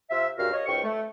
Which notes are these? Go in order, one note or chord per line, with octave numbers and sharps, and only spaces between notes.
C3 F4 E5
C#2 G2 F#4 A#4 F5
C#5 D#5
C#2 G#2 G5 C#6
A3